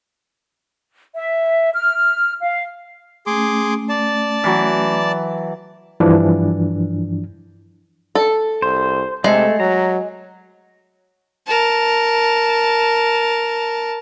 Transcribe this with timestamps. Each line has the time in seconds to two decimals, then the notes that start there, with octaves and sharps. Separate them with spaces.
1.15 E5
1.74 F6
2.41 F5
3.27 A3 C#4 G#4 C6 D6
3.89 D5 A5
4.44 E3 F#3
6.00 G2 E3 F3 D4
8.15 A4
8.62 C2 C5
9.24 C3 G#3 A3 A4
9.60 F#3 A#5
11.47 A#4 A5